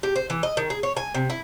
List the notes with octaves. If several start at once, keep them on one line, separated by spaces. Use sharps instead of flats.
G4
C5
E3
D#5
D#3
G#4
C#5
G#5
C3
E4